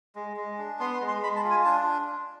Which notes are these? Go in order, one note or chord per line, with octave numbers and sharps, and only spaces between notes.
G#3
G#3
D4
B3 C6
C6
G#3
C6
G#3 B5
A5
F4
G#5
D4 A5